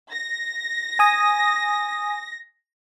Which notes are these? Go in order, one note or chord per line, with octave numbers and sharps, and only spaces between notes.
A#6
G#5 D#6